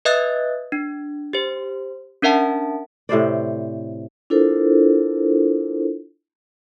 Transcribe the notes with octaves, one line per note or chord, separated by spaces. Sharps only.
B4 D#5 E5 D#6 F#6 A6
D4
G4 C5
C#4 D4 A#4 E5 F#5 A5
A2 C3 C5 D5
D4 E4 F4 A4 A#4 C5